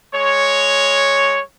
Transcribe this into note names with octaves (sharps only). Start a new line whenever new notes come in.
G#3 C#5